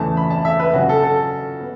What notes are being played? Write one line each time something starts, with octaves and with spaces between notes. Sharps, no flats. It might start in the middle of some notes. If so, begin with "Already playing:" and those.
Already playing: E2 C#3 E3 A3 A5
B5
A5
E5
B4
C#3 F#3 C#4 F#4
A4
A4
B3